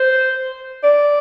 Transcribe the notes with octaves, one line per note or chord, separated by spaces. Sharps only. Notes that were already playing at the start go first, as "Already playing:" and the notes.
Already playing: C5
D5